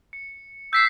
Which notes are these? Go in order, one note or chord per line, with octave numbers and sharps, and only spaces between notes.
C#7
E6 G6 B6 C7